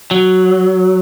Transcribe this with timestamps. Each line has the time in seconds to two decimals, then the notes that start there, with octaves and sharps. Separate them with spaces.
0.11 F#3